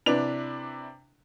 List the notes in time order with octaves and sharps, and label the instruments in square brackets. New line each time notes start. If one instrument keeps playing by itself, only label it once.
[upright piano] C3 D4 E4 B4 F7